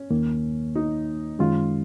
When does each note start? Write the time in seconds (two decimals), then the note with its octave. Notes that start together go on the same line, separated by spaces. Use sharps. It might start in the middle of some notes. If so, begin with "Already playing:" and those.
Already playing: C#4
0.11 D#2 D#3 A#3
0.75 D#4
1.39 F#2 D#3 G#3 C#4 F4